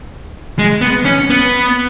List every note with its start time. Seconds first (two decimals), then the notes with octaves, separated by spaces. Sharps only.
0.59 G#3
0.81 B3
1.05 C#4
1.30 B3